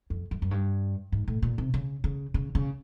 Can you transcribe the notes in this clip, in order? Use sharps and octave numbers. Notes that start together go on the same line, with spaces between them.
F2
F#2
F#2
G2
G#2
A2
A#2
C3
C#3
C#3
C#3
C#3